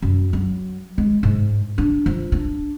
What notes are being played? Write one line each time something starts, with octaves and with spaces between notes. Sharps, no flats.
F#2
F#3
G#3
G#2
D4
F3
D4